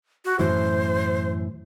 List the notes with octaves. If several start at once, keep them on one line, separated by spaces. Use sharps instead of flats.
F#4
F#2 A2 E3 C5